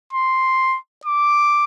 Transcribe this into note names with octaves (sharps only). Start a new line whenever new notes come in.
C6
D6